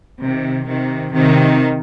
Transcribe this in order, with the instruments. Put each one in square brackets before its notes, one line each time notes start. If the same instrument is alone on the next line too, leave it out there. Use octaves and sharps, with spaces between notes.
[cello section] C3 D#3
C3 D#3
C3 D#3